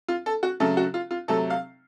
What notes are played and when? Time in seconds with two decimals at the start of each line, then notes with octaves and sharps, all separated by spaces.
0.08 F4
0.26 A4
0.43 F#4
0.60 C#3 F#3 A3 A4
0.77 F#4
0.94 F4
1.11 F4
1.28 C3 F#3 A3 A4
1.50 F5